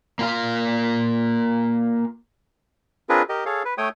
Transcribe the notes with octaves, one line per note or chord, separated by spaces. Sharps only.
A#3 F4 F5
C4 D4 F4 G#4 A#4 B4
G4 A#4 D#5
G#4 A4 C#5 F5
B4
A3 C#5 G5 D#6